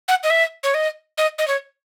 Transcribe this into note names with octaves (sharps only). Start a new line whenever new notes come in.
F#5
D#5
E5
C#5
D#5
D#5
D#5
C#5